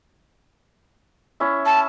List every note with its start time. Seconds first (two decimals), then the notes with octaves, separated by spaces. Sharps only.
1.40 C#4 E4 E5
1.66 A5